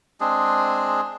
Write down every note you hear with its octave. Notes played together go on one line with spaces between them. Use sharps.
G#3 C4 D4 G#4